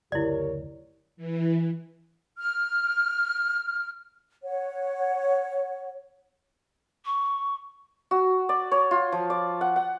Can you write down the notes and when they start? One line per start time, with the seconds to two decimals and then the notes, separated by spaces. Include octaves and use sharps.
0.12 F#1 D2 E4 G4 A#4 C#5 D5
1.17 E3
2.37 F6
4.44 C#5 F#5
7.05 C#6
8.11 F#4
8.49 D5
8.71 C#5
8.91 F4
9.12 F3
9.30 D5
9.61 F#5
9.76 F#5